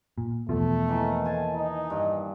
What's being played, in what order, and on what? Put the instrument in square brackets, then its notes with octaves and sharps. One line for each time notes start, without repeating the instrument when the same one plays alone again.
[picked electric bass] A#2
[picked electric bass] E2 B2 F3 [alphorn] A3
[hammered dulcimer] D#3 E3 A#3
C5 G#5 A5
[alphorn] D#4
[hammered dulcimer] G2